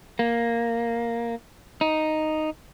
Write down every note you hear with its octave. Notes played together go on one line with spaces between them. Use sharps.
A#3
D#4